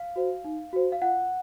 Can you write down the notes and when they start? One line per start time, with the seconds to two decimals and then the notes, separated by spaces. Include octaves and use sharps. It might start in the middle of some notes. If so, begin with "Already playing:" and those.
Already playing: F5
0.16 F#4 C5
0.44 D#4
0.73 F#4 C5
0.92 F5
1.02 F4 F#5